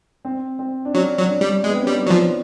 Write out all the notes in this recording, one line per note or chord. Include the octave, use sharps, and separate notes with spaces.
C4
C4
D4
F#3 C#4
F#3
D4
G3
G#3
B3
C4
C#4
G3
D4
D#4
F#3
F3